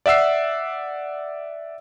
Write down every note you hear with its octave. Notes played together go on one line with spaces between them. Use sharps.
D5 E5 F#5 E6 C7